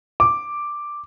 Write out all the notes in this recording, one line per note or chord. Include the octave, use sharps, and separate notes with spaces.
D6